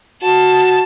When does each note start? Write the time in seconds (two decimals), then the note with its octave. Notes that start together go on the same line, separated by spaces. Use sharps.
0.23 F#4 A5